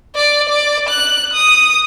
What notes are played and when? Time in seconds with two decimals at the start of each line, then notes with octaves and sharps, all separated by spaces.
0.15 D5
0.49 D5
0.89 F#6
1.33 D#6